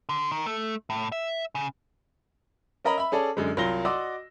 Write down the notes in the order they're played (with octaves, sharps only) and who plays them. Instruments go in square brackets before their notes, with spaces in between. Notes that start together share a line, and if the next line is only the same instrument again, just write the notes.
[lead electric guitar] D3
D#3
A3
A2
E5
C#3
[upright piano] C#4 A#4 D#5 A#5 B5
E5 B5
C#4 G#4 A4 D5
F#2 D3 G#3
C2 F#3 F4 A#6 G7
F#4 D5 D#5 C6 D6 E6